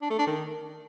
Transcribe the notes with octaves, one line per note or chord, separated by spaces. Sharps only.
D4
A3
D4
D#3